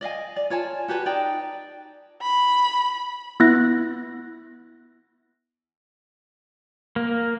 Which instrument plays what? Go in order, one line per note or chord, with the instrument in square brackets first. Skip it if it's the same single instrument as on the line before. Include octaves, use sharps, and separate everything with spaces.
[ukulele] D5 D#5 F5 G#5
D5
F4 C#5 G#5 A5
F#4 G4 B4 A5
D#4 D5 G5
[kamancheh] B5
[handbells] B3 E4 F#6 A#6
[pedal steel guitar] A#3